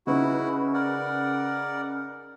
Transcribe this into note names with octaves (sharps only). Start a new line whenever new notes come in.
C#3 D#4 E4 F#4 B4
A#4 D5 F#5